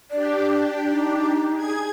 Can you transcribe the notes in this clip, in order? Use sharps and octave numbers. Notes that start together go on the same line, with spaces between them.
D4 G4 D5
D#4
G#4 G#6